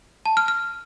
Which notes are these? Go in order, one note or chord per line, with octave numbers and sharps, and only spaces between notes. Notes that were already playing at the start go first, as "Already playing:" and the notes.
A5
F6
F6